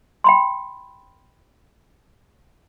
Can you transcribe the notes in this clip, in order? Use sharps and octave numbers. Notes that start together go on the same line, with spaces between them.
G5 B5 C6